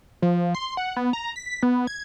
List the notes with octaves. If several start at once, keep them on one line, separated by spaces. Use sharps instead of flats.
F3
C6
F#5
B3
A#5
B6
B3
G#6